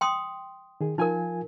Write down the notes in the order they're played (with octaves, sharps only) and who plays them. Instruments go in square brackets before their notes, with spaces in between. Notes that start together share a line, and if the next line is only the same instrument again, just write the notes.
[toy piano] G5 C6 D#6
[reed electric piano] D#3 G#4
[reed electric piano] F3 F4 G#5 [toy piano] D#4 A#4